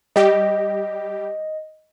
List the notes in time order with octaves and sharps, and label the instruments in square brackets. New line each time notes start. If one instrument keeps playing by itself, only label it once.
[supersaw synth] G3 G4 [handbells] D#5